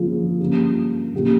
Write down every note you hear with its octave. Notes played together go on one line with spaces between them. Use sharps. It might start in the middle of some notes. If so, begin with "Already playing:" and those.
Already playing: F3 A#3 C#4 F4 G#4
G3 A#3 C#4 F4
A#2 F3 A#3 C#4 G4